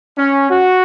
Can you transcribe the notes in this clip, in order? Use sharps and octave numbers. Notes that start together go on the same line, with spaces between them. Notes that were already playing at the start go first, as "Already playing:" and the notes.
C#4
F#4